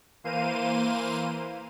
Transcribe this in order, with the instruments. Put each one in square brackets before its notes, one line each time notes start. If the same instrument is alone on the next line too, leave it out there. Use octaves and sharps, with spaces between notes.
[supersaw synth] E3 A#3 C5 F5 D#7